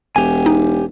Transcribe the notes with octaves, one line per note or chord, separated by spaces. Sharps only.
E1 G4 G#5
D#4